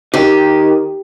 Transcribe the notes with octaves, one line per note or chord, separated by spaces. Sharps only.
D#3 G4